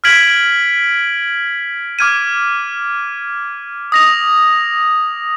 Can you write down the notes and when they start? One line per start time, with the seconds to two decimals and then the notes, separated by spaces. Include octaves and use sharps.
0.04 F6 G#6 B6 D7 F#7
1.99 D6 F6 G#6 D#7
3.92 D#6 A#6 F7